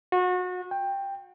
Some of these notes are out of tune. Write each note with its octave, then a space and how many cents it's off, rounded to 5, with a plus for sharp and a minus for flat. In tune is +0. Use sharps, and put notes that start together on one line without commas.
F#4 -30
G5 +10